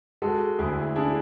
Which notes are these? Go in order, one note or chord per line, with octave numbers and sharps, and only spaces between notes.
G#3 F#4 A4
D2 E4 G#4
D4 E4 G#4